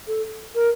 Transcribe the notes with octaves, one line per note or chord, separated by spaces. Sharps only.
A4
A#4